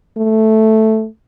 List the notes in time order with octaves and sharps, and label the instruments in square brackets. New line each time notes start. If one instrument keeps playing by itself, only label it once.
[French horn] A3